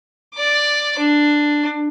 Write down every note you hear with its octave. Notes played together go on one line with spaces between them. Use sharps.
D5 D6
D4